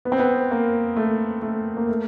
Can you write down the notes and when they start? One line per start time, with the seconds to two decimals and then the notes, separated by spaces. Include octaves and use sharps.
0.05 B3
0.12 C4
0.19 B3
0.51 A#3
0.96 A3
1.42 A3
1.77 A#3
1.89 A3